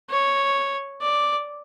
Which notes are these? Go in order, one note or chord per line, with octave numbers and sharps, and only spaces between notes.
C#5
D5